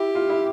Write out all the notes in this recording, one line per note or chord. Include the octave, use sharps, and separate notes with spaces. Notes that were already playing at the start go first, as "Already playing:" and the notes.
Already playing: E4 G4
F4
E4